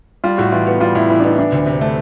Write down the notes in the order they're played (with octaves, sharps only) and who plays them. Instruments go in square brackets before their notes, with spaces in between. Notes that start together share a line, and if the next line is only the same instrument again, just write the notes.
[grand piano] G3 [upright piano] F4
[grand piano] A2 [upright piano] F#4
[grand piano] E3 [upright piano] F4
[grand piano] B3 [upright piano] F#4
[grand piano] G3 [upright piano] F4
[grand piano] A2 [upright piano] E4
[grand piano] E3 [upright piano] E4
[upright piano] D4
[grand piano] B3 [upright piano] D#4
[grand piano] E3 [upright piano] D4
[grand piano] D2
C3
A3